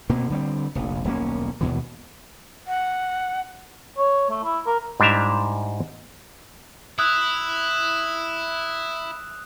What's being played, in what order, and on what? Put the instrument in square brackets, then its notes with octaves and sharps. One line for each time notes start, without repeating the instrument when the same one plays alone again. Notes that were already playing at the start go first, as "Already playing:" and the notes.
[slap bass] B2 A#3 C4
D3 G3 A#3 C4
F1 A#1
D#1 B1 A#3 C#4
D#2 B2 E3
[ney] F#5
[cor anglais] C#5
A3
E4
A#4
[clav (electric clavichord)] G#2 G3 D4 E4 E5 A#5
[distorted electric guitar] E4 [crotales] D#6 E6 F#6